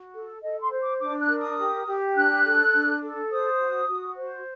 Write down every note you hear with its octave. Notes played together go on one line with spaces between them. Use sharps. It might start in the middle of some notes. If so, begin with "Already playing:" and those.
Already playing: F#4
A4
A4 D#5
C6
C5
D6
D4 D6
F#6
A#4
D#6
G4
G4
D4 F#6
A4
D4
A4
C5 D#6
F#4
F#4
C5